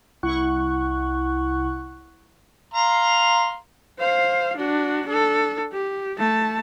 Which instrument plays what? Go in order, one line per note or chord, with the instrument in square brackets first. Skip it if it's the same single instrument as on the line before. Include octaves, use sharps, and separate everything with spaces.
[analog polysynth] C2 E4 F#5 C#6 F#6
[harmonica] F5 A#5 C6
[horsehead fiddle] C5 F5
D4 F#4
D4 A4
G4
A3 A5